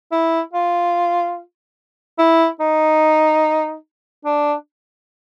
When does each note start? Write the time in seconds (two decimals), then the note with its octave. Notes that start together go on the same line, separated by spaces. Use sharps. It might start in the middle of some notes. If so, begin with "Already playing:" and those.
0.12 E4
0.53 F4
2.18 E4
2.60 D#4
4.25 D4